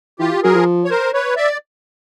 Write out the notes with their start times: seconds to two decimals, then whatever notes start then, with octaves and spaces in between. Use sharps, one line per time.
0.19 E3 F4 G4
0.43 F#3 G#4 A#4
0.55 F3
0.85 C#5
0.90 A#4 C5
1.13 B4 C#5
1.36 D5 E5